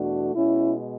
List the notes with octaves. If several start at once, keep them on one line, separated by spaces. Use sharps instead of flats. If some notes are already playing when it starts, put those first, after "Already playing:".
Already playing: E2 B2 A3 D4 F#4
B2 G#3 C#4 E4